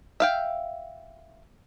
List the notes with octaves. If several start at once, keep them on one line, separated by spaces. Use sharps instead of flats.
E5 F5 G5